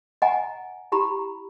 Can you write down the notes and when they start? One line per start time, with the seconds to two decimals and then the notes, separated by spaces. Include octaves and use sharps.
0.22 D#5 F#5 G#5 A#5
0.92 E4 G4 A#5 B5